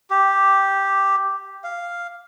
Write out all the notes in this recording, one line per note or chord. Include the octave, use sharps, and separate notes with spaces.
G4
F5